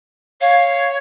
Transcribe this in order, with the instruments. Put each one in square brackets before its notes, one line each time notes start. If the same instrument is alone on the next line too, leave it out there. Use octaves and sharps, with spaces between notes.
[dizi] C#5 [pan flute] F5